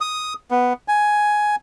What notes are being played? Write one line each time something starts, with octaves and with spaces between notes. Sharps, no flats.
D#6
B3
G#5